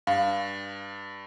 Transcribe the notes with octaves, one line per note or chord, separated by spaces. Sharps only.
G2 F5